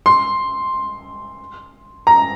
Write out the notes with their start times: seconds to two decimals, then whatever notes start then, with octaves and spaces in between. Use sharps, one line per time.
0.06 C6
2.07 A#5